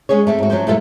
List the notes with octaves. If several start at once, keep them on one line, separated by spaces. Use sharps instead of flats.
G#3 C#4 G#4 C#5
A3 C4 A4
G#2 F#4
F3 F#3 G#3 C#4 C5
G2 A#2 E3 A3 F4 A4